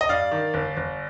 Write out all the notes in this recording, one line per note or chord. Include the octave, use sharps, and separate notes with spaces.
D#5
G2 D5 F5
D#3
G1
G1